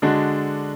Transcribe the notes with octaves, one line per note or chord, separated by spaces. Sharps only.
D3 G#3 D4 F#4